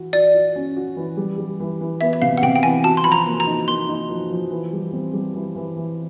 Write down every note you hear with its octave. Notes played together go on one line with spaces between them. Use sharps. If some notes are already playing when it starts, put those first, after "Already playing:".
Already playing: E3 F#4
F#4 D5
F#4
C#4
F#4
E3
G3
G3
E3
E3
B3 E5
E5
C3 F5
F#5
C3 G5
G5
E3 G#5
F#4 A5
C6
F3 B5
A#5
A#3
A#5
D#4
A#3 C6
D#4
F3
F3
E3
G3
C4
G3
E3
E3
E3